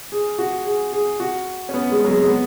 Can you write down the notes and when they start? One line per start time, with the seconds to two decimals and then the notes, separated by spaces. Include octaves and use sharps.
0.12 G#4
0.39 F#4
0.66 G#4
0.93 G#4
1.20 F#4
1.69 C#4
1.74 B3
1.92 G#3
2.05 F#3
2.10 G#3
2.22 G#3
2.28 B3